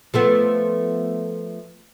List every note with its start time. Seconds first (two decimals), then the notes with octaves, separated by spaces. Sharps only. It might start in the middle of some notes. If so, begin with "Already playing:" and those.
0.14 F3 A3 B3